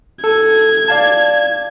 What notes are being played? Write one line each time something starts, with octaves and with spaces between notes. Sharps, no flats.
A4 G#6
D5 F5 A5